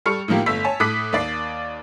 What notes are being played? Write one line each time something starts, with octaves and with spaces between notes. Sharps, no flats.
G3 A4 C#6 F6 C#7
A2 D#3 F3 A#3 G4
G1 A3 E6 B6
C#5 G#5 A5
A2 A4 D6 D#6 F#6 B6
D#2 D5 C7